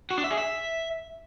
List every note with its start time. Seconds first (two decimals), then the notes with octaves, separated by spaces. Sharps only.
0.11 F#4
0.17 D4
0.24 E5
0.31 G#4
0.37 E5